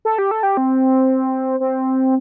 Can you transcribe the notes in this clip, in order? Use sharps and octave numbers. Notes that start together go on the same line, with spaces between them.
A4
G4
A4
G4
C4
C4